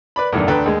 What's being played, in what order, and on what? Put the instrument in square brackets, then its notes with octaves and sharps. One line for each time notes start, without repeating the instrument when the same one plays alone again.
[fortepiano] B4 D5 B5
E2 G2 A#2 D3 D#3
D2 D4 A4 B4 G5 A#5
D#2 G#3